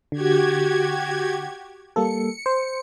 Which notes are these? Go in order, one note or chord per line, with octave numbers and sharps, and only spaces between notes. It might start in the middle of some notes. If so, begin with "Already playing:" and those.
D3 F#4 G4 G#6
G3 A#3 A4 C#7
C5